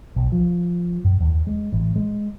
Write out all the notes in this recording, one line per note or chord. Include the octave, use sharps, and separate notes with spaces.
B1
F3
F#2
D#2
G#3
A1
G#3